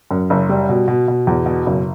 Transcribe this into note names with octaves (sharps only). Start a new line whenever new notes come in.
F#2
F#1
G3
B2
B2
B2
E2
B2
F#1